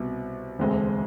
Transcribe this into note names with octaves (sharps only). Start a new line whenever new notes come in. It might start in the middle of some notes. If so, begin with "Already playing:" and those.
Already playing: C2 B2 B3
E1 D2 D3 G#3 C4